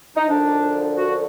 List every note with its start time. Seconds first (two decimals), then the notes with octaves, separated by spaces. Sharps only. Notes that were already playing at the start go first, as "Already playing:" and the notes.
0.16 D#4
0.28 F#2 D3 F3 D4
0.98 F#4